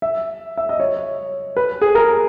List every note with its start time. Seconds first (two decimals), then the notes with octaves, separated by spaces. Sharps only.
0.02 E5
0.57 E5
0.69 D#5
0.80 C#5
1.57 B4
1.82 G#4
1.95 A#4